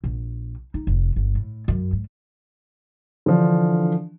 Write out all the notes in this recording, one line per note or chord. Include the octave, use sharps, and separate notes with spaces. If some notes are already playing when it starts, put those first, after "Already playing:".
A#1
D#4
F1
G1
A2
F#2
G#2
D3 E3 F3 D4